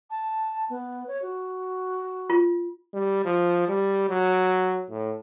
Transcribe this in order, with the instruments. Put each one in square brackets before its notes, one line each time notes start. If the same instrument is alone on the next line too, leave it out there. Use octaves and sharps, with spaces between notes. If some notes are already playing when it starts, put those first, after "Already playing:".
[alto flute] A5
B3
C#5
F#4
[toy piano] F4
[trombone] G3
F3
G3
F#3
A2